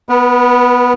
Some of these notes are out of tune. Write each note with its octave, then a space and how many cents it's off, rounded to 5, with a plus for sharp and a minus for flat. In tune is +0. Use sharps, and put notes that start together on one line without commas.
B3 +0 B4 -40